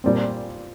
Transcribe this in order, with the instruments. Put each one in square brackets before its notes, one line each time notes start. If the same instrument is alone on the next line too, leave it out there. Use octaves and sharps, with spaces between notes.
[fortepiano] A#2 G3 C4